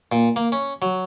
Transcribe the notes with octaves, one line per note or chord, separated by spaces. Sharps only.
A#2
A#3
C#4
F#3